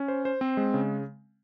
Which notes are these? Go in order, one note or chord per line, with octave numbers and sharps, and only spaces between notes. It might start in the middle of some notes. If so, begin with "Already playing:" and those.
Already playing: C#4
C5
C5
C4
G#3
C#3